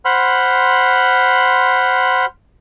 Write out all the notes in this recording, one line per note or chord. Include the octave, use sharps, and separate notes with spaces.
C5 F#5 B5 C6 F6